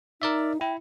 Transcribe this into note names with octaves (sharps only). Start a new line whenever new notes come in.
D#4 A#4 D5 E5
E4 G5